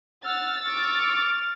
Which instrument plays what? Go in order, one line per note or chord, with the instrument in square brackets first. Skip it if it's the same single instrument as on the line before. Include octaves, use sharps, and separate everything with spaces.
[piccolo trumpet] F#5 [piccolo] E6 [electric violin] F6 [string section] A6
[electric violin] C#6 D6 [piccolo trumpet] F6